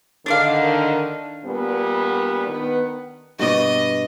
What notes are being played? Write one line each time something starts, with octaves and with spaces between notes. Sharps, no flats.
D3 D#3 D4 D5 F5
A#2 G3 B3
D#3 B3
G2 B2 D5 D#5